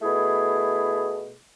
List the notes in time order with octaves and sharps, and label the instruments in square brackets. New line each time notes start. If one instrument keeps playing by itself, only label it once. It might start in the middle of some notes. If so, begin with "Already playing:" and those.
[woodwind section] B2 A3 E4 G#4